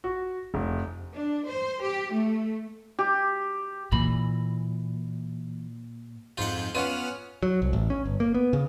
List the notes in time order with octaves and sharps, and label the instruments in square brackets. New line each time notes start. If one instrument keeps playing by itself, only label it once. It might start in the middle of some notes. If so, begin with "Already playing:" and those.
[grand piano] F#4
F1
[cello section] D4
C5
G4
A3
[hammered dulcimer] G4
[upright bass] A#2 [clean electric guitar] E3 B5
[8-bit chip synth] F2 G#2 G6 [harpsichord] F4 F#5
[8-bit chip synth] B3 F#5 F6 [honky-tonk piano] C#4 D#7 [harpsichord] F4
[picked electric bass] F#3
C2
A1
C#4
G1
A#3
B3
C#3